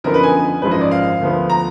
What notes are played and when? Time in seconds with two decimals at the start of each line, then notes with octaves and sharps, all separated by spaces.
0.04 F#2 D3 F3 B3 D#4 A#4
0.14 B4
0.23 G#5
0.62 G#1 F#2 F3 G#3 D#4 B4
0.71 D#5
0.81 D5
0.91 F5
1.20 D2 D3 F3 B3
1.50 A#5